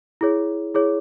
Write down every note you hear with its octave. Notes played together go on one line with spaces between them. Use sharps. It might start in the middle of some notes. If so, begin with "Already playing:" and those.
E4 G#4 C#5
E4 G#4 C#5